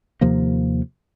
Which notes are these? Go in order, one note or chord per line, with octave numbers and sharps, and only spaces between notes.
D#2 C3 F3 A#3